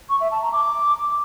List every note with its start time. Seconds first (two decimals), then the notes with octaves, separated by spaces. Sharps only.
0.10 C#6
0.21 E5
0.31 A5
0.42 A#5
0.53 D6